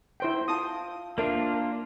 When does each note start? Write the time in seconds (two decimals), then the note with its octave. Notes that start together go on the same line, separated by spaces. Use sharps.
0.20 E4 C5 G5
0.48 F4 F5 A5 D#6
1.18 A#3 D4 F4 A#4 C5 E5